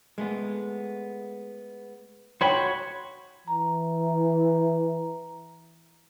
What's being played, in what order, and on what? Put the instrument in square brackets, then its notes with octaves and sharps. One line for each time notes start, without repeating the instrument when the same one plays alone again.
[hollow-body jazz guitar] G#3 A3 B3
[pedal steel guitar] F#4 C#5 B5 [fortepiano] G5 C6
[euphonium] E3 [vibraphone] A#5